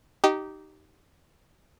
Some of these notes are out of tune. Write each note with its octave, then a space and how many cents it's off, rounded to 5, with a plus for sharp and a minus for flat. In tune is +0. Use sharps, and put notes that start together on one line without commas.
D#4 -5 G4 -20